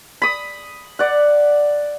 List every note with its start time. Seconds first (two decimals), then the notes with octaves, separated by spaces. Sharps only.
0.22 B5 D#6
0.99 D5 F#5